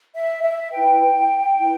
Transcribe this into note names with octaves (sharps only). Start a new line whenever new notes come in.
E5
E5
E4 B4 G5
E4 B4